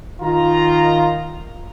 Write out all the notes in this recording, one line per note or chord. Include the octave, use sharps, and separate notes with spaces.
D#3 F4 A#5